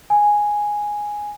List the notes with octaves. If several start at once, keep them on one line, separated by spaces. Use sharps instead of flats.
G#5